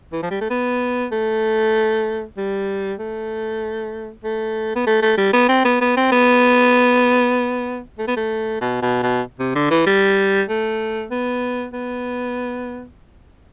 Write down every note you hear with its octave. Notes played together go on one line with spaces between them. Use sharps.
E3
F3
G3
A3
B3
A3
G3
A3
A3
B3
A3
A3
G3
B3
C4
B3
B3
C4
B3
A3
B3
A3
B2
B2
B2
C3
D3
E3
G3
A3
B3
B3